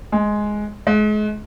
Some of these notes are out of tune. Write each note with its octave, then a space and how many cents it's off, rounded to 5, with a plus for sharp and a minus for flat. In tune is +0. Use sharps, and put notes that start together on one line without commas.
G#3 +5
G#3 +35